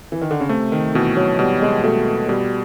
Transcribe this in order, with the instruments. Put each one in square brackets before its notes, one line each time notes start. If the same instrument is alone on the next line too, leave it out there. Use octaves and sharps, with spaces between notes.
[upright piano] E3
D#3
D3
C#3
[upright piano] C3 [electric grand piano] A3
[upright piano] D#3
[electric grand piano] B2 [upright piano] E3
[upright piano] F#3
[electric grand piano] B2 [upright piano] G3
[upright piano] G#3
[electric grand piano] B2 [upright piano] A3
[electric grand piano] B2 [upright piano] G3